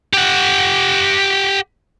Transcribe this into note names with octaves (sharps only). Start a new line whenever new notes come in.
G4 F#5